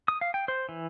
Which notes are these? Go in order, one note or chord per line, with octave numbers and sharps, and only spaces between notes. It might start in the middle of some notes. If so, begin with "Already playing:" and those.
D#6
F5
G5
C5
E3